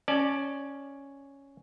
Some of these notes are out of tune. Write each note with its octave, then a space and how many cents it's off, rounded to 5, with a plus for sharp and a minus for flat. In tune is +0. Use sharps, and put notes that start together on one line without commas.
C#4 +0 D5 +10 A5 -20